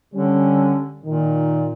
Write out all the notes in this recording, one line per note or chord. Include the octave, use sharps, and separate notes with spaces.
D3 G3 C#4
A#2 D#3